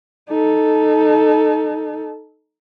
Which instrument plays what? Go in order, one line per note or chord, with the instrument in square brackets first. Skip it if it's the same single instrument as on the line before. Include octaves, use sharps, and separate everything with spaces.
[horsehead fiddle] D#4 A4